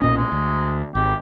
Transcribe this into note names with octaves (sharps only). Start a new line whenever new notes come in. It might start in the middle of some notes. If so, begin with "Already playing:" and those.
B1 A#2 C#4 D#5
G#3
D2
G#1 G4